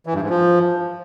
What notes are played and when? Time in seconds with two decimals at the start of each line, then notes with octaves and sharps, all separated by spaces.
0.06 E3
0.14 G2
0.22 G#2
0.29 F3